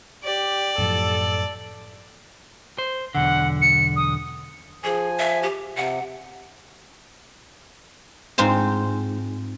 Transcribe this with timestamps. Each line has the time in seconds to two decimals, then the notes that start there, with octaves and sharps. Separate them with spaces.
0.24 G4 D5
0.78 F#2 A2 F3 A4
2.78 C5
3.15 B1 E2 D3 F#5
3.62 C#7
3.96 D#6
4.84 F3 G#4 G#5
5.19 E5
5.43 G4
5.76 C3 F#5
8.38 G#2 C4 F4 C5